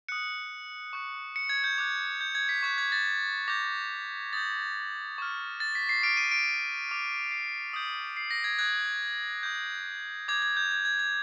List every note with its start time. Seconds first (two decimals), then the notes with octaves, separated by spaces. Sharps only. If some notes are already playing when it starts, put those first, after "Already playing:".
0.09 D#6 F#6 C#7
0.93 C#6 F#6
1.36 C#7
1.49 G#6
1.64 G6
1.78 D6 F#6
2.21 G6
2.35 G#6
2.49 B6
2.63 C#6 F#6 G#6
2.78 G#6
2.92 A6
3.48 D6 G6 A#6
4.33 D#6 G6 A6
5.18 C#6 F6
5.60 A6
5.75 B6
5.89 C7
6.03 D6 F6 D7
6.17 D#7
6.31 D7
6.89 D6 F6
7.31 C7
7.73 D#6 G6
8.17 C7
8.31 A#6
8.44 G#6
8.59 D#6 F#6 G#6
9.43 D#6 G6
10.28 D6 G6 G#6
10.42 G#6
10.57 G6
10.71 G#6
10.85 G#6
10.99 G#6